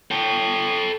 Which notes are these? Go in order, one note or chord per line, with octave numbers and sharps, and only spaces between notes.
A4 G5